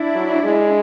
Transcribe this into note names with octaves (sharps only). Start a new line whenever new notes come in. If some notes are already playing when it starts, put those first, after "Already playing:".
Already playing: D4 E4
F#3
G#3